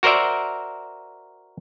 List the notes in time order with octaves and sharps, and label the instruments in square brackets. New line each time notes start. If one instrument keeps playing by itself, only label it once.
[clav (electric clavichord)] F#4 A#4 C5 D5 E5